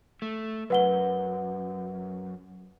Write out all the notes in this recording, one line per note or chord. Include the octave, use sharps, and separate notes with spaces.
A3
F#2 B4 F#5 G7